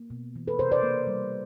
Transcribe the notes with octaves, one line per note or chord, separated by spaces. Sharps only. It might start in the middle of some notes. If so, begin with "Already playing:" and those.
Already playing: A#3
B2
E3
A4 B4
C3 A#4 C5
C5 D5
A#3
G3